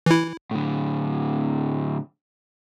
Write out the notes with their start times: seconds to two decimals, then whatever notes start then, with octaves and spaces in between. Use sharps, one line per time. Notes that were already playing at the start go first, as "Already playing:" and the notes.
0.06 E3 E4
0.51 A2 D3